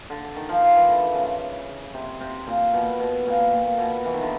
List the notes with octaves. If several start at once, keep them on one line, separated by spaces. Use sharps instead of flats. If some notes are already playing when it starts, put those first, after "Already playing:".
D3
D#3
F3
F3
E3
D3
C#3
C3
C3
A#2
B2
B2
A#2
A#2
B2
E3
D#3
D3